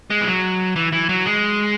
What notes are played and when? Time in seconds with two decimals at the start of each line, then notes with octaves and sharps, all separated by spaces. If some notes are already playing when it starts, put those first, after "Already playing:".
0.10 G#3
0.22 E3
0.27 F#3
0.76 E3
0.92 E3
1.09 F#3
1.26 G#3